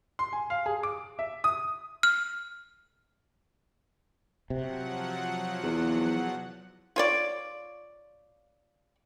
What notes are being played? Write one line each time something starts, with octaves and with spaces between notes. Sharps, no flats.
C6
G#5
F5
G#4
D6
E5
D#6
F6
C3 F3 F#3 F#5
E2
F4 C#5 D5